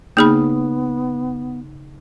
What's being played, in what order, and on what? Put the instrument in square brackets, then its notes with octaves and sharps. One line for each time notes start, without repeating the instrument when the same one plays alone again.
[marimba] C#3 D#4 [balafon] A#3 G#4 B5 [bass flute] B3